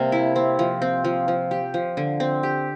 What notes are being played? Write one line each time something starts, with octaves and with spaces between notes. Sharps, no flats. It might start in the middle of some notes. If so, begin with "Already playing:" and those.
Already playing: C3 G3 A#3
E4
C4
F3
C4
F3
F3
G4
F3
D3
C4
G4